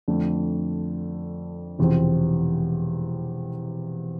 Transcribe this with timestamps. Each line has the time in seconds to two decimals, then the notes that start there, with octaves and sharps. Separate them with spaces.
0.08 F2 D3 A3
1.79 E1 E2 C3 F3 C4